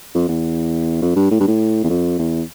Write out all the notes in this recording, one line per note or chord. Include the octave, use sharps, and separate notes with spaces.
F2
E2
F2
G2
A2
G2
A2
E2
F2
E2